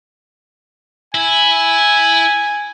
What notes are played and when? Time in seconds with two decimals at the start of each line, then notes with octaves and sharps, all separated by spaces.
1.15 E4 G#5